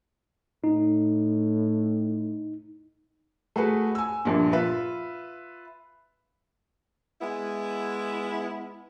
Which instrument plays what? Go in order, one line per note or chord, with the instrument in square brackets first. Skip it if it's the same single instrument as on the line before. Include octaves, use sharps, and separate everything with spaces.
[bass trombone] A2 [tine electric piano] D#4
[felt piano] A3 F#4 G#4 B4
G#5 E6
A#1 G2 A#2
F4 B4 E5
[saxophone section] G#3 B3 E4